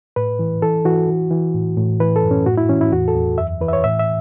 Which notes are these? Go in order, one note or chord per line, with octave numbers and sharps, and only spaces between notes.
A2 B4
E3
E3 A4
E3 F#4
E3
E3
A2
A2
E3 B4
A4
F#2
C#4
A2 F#4
E4
E3 C#4
E4
E2 F#4
A4
E2
F#2 E5
E3 B4
E5
C#5
A2 E5
E5